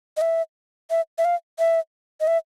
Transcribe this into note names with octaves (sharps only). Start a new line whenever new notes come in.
D#5
E5
E5
E5
F5
E5
D#5
E5